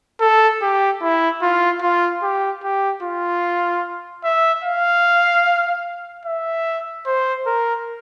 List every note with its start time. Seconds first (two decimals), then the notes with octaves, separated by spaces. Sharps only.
0.20 A4
0.62 G4
1.02 E4
1.42 F4
1.82 F4
2.22 G4
2.63 G4
3.03 F4
4.24 E5
4.65 F5
6.26 E5
7.06 C5
7.46 A#4